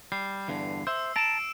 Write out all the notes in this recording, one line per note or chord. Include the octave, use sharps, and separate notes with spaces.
G3 C7
E2 G2 D3
C5 E5 E6
A5 A#5 D7 E7